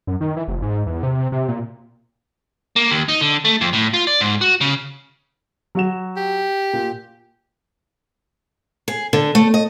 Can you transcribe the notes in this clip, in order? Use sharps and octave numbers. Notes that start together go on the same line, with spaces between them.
F#2
D#3
E3
F1
G#2
E2
C3
C3
C3
A#2
A#3
D#2
D#4
D3
A3
F2
A2
F4
D5
G#2
F#4
C#3
F#3 F#4 E7
G4
A#2
G#4
D3
A3
D#5